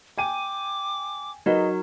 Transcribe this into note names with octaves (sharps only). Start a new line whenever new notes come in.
G5 G#5 D6 D#7
F#3 D#4 F#4 G#4 A#4 B4 D#5